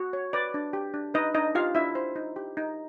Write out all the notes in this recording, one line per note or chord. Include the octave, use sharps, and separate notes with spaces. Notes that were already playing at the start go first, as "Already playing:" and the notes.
Already playing: F#4
C#5
B4 D5
D4
G4
D4
D#4 B4 D#5
D4 D#4 D#5
F4 G4 F5
D4 E4 E5
C5
D#4
G4
D#4